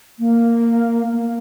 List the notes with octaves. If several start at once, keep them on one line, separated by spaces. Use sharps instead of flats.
A#3
A#3